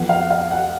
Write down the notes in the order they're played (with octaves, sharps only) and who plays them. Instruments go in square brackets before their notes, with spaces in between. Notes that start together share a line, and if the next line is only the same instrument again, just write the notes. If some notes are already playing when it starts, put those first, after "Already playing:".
Already playing: [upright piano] F2 F3 B3 F#5
F5
F5
F#5